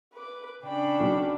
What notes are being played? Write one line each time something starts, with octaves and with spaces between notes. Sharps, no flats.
B4 D6
C#3 D4 G5 B5
B1 F#4